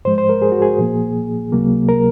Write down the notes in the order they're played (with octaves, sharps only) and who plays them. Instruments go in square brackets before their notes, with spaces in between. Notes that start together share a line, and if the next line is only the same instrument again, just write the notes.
[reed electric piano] G#2 F3 G#3 C5
C5
A#4
G#4
F#4
G#4
A#2 F3 A#3
C#2 C3 F#3 A#3
A#4